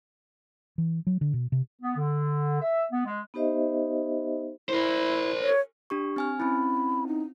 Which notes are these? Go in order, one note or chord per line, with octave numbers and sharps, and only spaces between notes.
E3
F#3
D3
B2
C3
B3
D3
E5
B3
G#3
B3 D#4 G4 C5 D#5 E5
E4 A#4 C5
C#5
D4 G4 C#6
C4 G#5 F6
C4 C#4 E4 B5
D#4